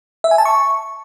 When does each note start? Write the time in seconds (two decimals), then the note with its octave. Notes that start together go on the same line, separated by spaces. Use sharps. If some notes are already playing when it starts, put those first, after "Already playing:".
0.24 E5
0.31 G#5
0.38 A5
0.45 C#6